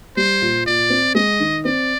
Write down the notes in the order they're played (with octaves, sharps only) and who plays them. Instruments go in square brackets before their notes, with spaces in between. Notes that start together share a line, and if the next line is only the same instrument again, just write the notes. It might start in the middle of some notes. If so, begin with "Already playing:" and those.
[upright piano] G3 [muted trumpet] C5
[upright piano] A#2
[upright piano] A#2 [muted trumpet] D5
[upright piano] C4
[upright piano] G#3 [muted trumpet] D#5
[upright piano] D#3
[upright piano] C4 [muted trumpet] D5